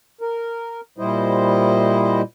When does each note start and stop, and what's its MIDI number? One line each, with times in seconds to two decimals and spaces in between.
0.21 0.81 70
0.98 2.22 46
0.98 2.22 55
0.98 2.22 64
0.98 2.22 72
0.98 2.22 75